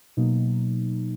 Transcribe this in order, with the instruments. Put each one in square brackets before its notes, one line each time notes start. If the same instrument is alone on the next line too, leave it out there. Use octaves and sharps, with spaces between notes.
[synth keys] B2 F#3 A#3 D#4